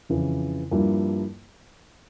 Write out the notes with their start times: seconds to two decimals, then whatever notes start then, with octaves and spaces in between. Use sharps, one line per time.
0.09 F2 C#3 E3
0.71 G2 F3 A#3 E4